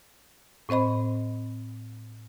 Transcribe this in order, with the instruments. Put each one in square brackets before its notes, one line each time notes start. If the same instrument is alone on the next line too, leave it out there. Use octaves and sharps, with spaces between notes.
[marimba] A2 C4 C5 D#5 B5